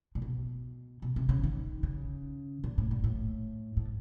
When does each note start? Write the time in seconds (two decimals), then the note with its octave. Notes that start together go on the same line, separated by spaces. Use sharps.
0.15 A#2
0.22 B2
1.02 B2
1.16 C3
1.29 C#3
1.44 D#3
1.83 C#3
2.64 A#2
2.78 A2
2.91 A#2
3.04 A2
3.77 A2